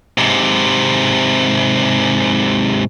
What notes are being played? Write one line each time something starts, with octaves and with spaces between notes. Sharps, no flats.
G#2 C3